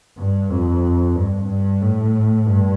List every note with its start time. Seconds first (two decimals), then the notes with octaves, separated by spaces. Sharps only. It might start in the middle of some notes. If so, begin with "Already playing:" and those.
0.18 G2
0.50 F2
1.16 G2
1.48 G2
1.81 A2
2.46 G2